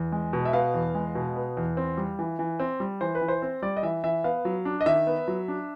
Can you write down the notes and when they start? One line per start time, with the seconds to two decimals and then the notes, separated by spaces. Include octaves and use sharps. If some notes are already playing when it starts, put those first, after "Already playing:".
Already playing: E2
0.12 G#3
0.33 B2
0.45 E5
0.53 B3 F5
0.74 E2
0.95 G#3
1.15 B2
1.36 B3
1.57 E2
1.77 C4
1.98 G3
2.19 E3
2.39 E3
2.59 C4
2.80 G3
3.01 E3 C5
3.15 B4
3.21 E3
3.28 C5
3.42 C4
3.62 G3 D5
3.77 D#5
3.83 E3 E5
4.04 E3 E5
4.24 B3 F5
4.45 F#3
4.65 D4
4.81 D#5
4.86 D#3 E5
5.07 B3
5.28 F#3
5.48 D4